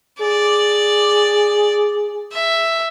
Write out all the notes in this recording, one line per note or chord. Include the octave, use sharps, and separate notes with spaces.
G#4 D5
E5